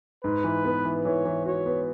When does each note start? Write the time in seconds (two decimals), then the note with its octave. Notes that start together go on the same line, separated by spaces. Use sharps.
0.24 G#2 B4
0.44 E3
0.65 B3
0.85 E3
1.05 E3 C#5
1.25 E3
1.45 F#4 C#5
1.66 B3